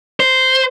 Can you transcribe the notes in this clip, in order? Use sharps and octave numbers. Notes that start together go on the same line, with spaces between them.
C5